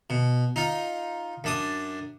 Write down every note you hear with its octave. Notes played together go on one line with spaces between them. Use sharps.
B2
D#4 F4
F#2 D4 D#6